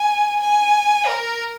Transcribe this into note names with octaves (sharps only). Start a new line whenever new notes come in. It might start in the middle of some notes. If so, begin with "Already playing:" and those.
Already playing: G#5
G#5
A#4